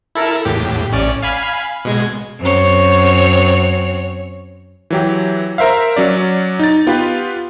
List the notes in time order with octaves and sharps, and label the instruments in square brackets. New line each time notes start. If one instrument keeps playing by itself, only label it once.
[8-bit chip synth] E4 A4 A#4
E2 A2 G4
A1 C#4 D5
F5 G#5 B5
B2 G#3 G#6
[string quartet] F#2 C4 C#5
[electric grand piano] E3 F#3 G4
A#4 C5 E5 F5
F#3 C#4 D5
D#4 A6
B3 F4 G4 B4